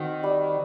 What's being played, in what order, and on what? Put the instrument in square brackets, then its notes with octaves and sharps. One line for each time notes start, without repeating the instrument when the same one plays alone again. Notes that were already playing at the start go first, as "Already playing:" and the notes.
Already playing: [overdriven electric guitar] D#3 [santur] C4 F#4
[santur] G3